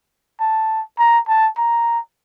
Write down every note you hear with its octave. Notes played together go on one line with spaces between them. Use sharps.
A5
A#5
A5
A#5